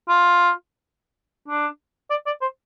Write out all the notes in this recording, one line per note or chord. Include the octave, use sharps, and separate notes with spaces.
F4
D4
D5
D5
C5